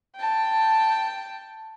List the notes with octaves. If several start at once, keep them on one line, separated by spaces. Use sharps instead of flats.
G5 A5